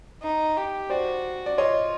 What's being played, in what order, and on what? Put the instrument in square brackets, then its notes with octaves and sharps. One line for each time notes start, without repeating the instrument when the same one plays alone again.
[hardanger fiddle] D#4
G4
[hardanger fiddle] F#4 [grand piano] C5 D5
[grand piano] D5
[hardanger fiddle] F4 [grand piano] C#5 D#5